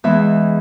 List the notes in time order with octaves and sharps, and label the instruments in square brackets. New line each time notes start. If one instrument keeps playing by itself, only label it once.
[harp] E2 E3 G#3 E5